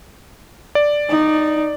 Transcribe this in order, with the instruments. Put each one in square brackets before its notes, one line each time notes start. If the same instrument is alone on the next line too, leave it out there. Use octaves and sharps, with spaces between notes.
[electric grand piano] D5
[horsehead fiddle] D#4